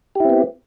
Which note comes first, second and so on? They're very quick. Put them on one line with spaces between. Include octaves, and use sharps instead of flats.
G4 E4 C4 B3